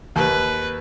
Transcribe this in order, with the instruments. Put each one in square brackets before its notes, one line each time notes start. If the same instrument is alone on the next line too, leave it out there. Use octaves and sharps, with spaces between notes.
[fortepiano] D#2 [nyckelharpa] B4